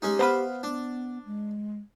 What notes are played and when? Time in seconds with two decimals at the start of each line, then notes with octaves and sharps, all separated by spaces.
0.02 G#3 C#4 D#4 G4
0.19 B3 C5 F5 A#5 B5
0.63 B3 D4
1.26 G#3